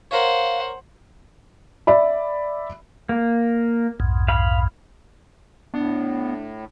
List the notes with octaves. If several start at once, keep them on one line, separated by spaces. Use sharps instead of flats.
A#4 C5 C#5 F5 F#5
D5 E5 B5
A#3
B1 F2 G#2
F5 B5
A2 B3 D4